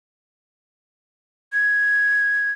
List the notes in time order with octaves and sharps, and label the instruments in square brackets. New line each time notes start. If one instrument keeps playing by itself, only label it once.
[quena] G#6